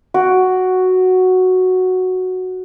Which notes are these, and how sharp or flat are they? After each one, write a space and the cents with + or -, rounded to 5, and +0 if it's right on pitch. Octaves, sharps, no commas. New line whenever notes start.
F#4 +0 D6 +0